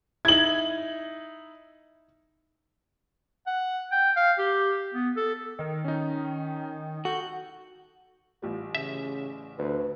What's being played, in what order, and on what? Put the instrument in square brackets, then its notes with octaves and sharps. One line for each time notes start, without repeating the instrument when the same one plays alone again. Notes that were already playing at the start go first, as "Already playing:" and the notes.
[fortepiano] D#4 E4 [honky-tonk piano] G#6 F#7
[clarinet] F#5
G5
F5
G4
B3
A4
[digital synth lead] D#3 [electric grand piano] A#4 D#5
[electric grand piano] C#4 D#4
[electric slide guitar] F#4 [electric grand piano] A4 [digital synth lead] G6
[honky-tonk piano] A1 G3 [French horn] F4
[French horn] C#3 [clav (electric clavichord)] E5
[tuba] D2 [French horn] B4